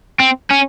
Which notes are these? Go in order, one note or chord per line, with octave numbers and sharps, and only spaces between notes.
C4
C#4